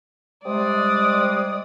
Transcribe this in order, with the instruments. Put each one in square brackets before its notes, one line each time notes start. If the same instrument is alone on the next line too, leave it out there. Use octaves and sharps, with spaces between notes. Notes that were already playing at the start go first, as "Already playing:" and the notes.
[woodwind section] C3 G3 G#3 [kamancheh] D5 D#6